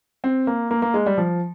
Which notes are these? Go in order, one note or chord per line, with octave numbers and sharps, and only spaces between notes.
C4
A#3
A#3
A#3
G#3
G3
F3